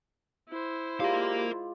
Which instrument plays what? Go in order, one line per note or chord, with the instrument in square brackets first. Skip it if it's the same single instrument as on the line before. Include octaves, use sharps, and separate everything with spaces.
[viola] E4 C5
[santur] G#3 F4 D5 [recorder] G4 [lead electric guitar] A#4 F5